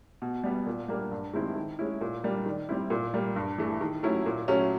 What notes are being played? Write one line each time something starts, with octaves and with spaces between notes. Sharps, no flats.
B2
G3 B3
A#2
G3 A#3 D4
G2
D#3 G#3 C4 E4
D#3
G#3 C#4 E4
A#2
G3 A#3 D4
D#3
G3 C4 E4
A#2
G3 A#3
G2
E3 A3
D#3
F#3 A3 C#4 E4
A#2
F#3 A3 C#4